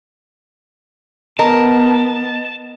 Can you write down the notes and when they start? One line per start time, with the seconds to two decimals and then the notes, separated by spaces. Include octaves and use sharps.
1.39 B3 A#4 D#5 A5